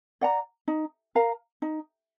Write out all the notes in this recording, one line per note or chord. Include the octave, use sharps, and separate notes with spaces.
D5 F#5 A#5
D#4
A#4 F5 A#5
D#4